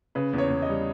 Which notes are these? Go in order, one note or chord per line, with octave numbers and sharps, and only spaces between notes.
C#3 B4
E2
C#5
E2
D#5
G3